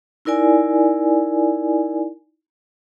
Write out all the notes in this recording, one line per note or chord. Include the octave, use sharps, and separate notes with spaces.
D#4 E4 A#4 D5 G#5